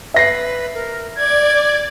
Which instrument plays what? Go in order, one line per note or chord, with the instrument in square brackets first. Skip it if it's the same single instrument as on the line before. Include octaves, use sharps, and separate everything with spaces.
[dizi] B4 [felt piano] E5 A#6 C7
[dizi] A#4
[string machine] D5 [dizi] G#6